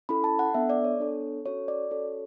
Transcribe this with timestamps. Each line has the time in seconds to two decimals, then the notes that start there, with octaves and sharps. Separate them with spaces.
0.09 C#4 E4 A4 B5
0.24 A5
0.39 F#5
0.54 B3 D4 A4 E5
0.70 D5
0.84 C#5
1.00 B3 D4 A4
1.45 C#4 F#4 A4 C#5
1.68 D5
1.91 C#4 F#4 A4 C#5